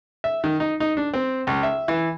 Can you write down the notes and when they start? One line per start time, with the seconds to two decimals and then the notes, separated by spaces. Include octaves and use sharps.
0.24 E5
0.44 D#3
0.60 D#4
0.80 D#4
0.97 D4
1.14 C4
1.47 C#2
1.63 E5
1.88 E3